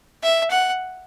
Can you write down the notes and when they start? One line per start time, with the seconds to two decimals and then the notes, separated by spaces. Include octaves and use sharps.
0.23 E5
0.51 F#5